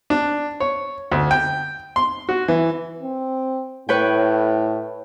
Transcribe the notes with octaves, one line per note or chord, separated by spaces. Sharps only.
D4
C#5
D2
G5
C6
F#4
E3
C4
A2 B4 C#5 G5